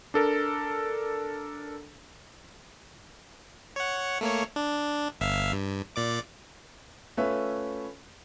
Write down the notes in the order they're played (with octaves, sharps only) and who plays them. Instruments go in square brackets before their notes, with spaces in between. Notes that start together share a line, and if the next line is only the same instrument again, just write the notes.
[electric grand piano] D4 A4 A#4
[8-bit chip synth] C#5 F#5
A3 A#3 C#5
D4
G1 E5 F5
G2
A#2 D5 D6
[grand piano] A3 C#4 F4 B4 C#5 E5